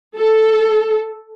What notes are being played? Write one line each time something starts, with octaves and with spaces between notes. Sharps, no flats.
A4